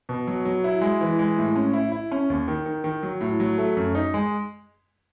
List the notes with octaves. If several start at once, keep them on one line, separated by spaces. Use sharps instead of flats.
B2
F#3
F#3
E4
G#3
E3
G#3
A2
C#4
E4
E4
C#4
D#2
D#3
D#3
D#3
F#3
A2
F#3
A3
F#2
D#4
G#3